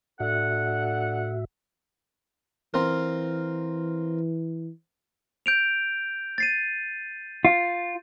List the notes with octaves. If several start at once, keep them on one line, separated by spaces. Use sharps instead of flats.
A2 D4 F#4 A4 E5 F#5
E3 C4 F4 A#4
G6 D7 F7
A6 C7 D#7
F4